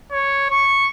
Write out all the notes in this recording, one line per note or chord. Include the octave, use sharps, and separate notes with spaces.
C#5
C#6